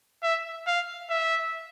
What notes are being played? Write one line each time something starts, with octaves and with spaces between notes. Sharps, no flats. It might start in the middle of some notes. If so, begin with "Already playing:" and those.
E5
F5
E5